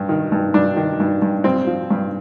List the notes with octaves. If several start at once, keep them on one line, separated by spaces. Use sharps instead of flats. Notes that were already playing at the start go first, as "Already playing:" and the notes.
Already playing: G2
D#3
G2
G2 D4
D#3
G2
G2
G2 C4
F3
G2